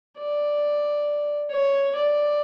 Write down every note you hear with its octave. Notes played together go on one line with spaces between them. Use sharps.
D5
C#5
D5